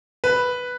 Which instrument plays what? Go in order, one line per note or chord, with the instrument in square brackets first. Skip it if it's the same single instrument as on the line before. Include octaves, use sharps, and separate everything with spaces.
[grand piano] B4